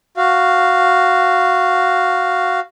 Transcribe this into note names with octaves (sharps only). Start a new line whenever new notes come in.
F#4 F5